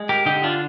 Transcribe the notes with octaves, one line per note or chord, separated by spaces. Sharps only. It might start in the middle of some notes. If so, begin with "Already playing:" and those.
Already playing: G#3
G4 A#4
D3 D#4 G4
D4 F4